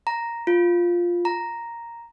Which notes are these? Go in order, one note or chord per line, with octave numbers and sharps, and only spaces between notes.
A#5
F4
A#5